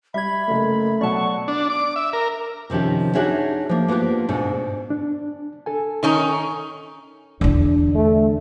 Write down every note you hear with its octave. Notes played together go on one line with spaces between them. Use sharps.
G3 E5 B5 G#6
F#1 A3 A#3
B2 F#3 D5 F#5 A5 C#6
D4
D6
E5
A#4
C3 D#3 F3 C#4 G4
D4 D#4 F#4 G#4 C#5 E5
F3 A#3
A#3 B3 D4 F4 G4
G#2 B2 C4 D4
D4
A4 G#5
D#3 C#4 D#4
E2 D3 D4
A3